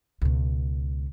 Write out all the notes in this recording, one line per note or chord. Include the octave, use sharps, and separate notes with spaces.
C#2 B2